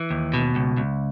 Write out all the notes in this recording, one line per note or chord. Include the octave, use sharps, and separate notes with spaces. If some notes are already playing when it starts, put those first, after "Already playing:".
Already playing: E3
D#2
B2
C#2
C#2